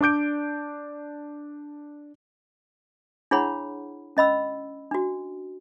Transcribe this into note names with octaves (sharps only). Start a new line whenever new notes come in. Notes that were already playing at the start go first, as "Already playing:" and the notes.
D4 D5 D6 G6 D7
D4 E4 G#4 C#5 F#5 B5
C#4 D#5 B5 E6
D4 F#4